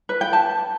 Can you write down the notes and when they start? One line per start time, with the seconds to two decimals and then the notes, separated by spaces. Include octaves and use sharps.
0.09 B4
0.21 G5
0.33 A5